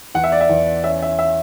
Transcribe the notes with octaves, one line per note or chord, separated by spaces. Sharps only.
E2 F#5
E5
D5
E5
E2
C#4 E5
E5
E5